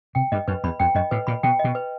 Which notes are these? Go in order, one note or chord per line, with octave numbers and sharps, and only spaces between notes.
C3 G5
G2 D#5
F#2 B4
E2 B5
F2 G5
F#2 D#5
A2 B4
A#2 B5
B2 G5
B2 D#5
B4